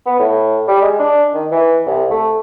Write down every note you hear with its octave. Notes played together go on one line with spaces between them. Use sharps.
B3
A2
G3
G#3
D4
D#3
E3
C2
A3